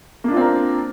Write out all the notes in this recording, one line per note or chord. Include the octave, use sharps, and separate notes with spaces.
A#3 C4 D4 F4 A#4